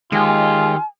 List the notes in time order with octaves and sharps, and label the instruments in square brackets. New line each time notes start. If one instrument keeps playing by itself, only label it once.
[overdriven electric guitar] D#3 G4 [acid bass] G#3 [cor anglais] F4 [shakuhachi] G#5